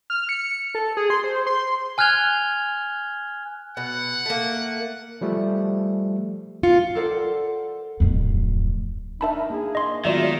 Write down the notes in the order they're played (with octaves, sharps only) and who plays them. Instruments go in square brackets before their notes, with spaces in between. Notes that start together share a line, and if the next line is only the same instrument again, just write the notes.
[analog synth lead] F6
C#7
A4
G#4
C6
C5
C6
[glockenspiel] G#5 F6 F#6 G#6 F7 G7
[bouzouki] B2 [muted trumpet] F#5
[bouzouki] A3 A#3
[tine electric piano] F3 G3 A3
[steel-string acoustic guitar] F4 [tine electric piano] C#7
[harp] A4 A#4 C5 D5 F#5
[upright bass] D1 F2
[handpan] D4 A#4 [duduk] D#4 [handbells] E5 A5 B5
[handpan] A#3 E4 [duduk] G#4
[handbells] D#5 C6
[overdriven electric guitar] D#3 [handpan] F#3 G#3 B3 [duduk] F4 [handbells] F#4 D5 E5